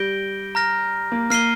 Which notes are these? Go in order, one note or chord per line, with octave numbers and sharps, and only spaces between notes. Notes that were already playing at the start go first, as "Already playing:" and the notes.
Already playing: G3 G6 A#6 D7 G7
A#5 F6 A#6
A#3
A#3 F6 C7 D#7 G7